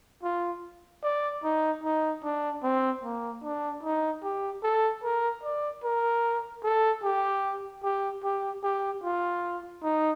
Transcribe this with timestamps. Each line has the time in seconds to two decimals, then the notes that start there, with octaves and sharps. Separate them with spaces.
0.23 F4
1.03 D5
1.43 D#4
1.84 D#4
2.23 D4
2.63 C4
3.03 A#3
3.43 D4
3.83 D#4
4.23 G4
4.63 A4
5.03 A#4
5.43 D5
5.84 A#4
6.64 A4
7.03 G4
7.84 G4
8.24 G4
8.63 G4
9.04 F4
9.83 D#4